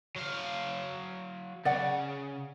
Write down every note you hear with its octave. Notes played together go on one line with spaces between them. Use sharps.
F#3 F5
C#3 D5 F#5